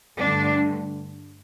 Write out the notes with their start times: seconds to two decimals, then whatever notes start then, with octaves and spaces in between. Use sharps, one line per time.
0.19 G2 D3 A3 D4